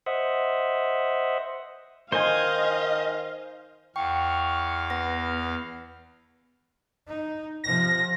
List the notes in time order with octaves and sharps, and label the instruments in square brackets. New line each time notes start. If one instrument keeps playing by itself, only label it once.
[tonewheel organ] C5 D#5 E5 F#5
[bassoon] D#3 [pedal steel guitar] C5 G#5 [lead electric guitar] D#5 [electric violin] F5
[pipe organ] E2 F5 [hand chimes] G5 [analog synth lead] C#6
[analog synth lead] B3 [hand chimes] A#6
[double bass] D#4
[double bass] C3 F3 [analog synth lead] A#6